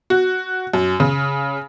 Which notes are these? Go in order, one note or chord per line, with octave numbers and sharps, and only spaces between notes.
F#4
F#2
C#3